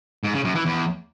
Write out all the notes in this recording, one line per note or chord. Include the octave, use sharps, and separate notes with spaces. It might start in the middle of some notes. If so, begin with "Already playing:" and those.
G#2
C#3
F#2
E3
E2